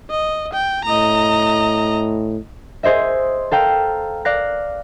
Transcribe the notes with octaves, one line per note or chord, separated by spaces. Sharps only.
D#5
G5
A2 D#5 A#5
G#4 C5 D#5 E5
A4 F5 G5 A#5
D5 F5 F#6 A#6